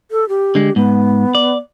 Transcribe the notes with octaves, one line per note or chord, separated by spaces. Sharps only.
A4
G4
D3 G#3
G#2 B3
D5